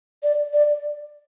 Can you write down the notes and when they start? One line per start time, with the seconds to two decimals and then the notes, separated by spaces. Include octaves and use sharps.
0.23 D5
0.53 D5